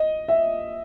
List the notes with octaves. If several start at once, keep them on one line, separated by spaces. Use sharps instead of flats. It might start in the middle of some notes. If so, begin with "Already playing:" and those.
Already playing: D#5
E5